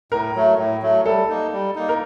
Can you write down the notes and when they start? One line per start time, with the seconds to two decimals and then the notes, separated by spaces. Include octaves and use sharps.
0.12 A2 A#4
0.35 F#3 A3
0.58 A2
0.82 F#3 A3
1.06 G3 A4
1.29 A#3 D#4
1.52 G3
1.75 A#3 D#4
1.89 A#4